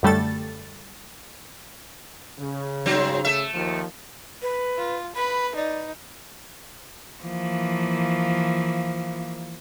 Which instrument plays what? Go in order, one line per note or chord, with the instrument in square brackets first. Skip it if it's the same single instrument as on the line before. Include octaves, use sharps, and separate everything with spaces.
[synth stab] F#2 D3 G3 A3 A4 A6
[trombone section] C#3
[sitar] G2 F#3 C4
A3 E5
[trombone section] D#2 F3
[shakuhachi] B4
[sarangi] F4
[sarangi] B4 [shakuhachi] B5
[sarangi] D#4 [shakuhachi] D5
[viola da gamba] E3 F3 A#3